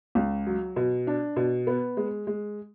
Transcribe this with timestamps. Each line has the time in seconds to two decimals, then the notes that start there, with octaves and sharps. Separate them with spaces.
0.15 C#2
0.47 F#3
0.76 B2
1.07 D4
1.36 B2
1.67 B3
1.97 G#3
2.27 G#3